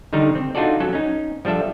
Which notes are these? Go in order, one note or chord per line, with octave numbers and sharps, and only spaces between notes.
D3 D#3 G3 D#4 A#4
C4
D4 D#4 F4 F#4 A4 D5
F#3 C#4 A4
C#4 D#4
F3 G3 D4 A4 E5